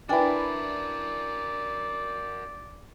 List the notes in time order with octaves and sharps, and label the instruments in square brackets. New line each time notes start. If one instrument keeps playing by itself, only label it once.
[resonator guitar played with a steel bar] D4 E4 [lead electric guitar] F#4 A#4 [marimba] B4 G5 G#5 [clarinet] D5